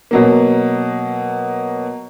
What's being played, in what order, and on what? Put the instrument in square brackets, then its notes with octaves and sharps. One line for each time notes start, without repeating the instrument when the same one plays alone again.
[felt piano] B2 F#3 A#3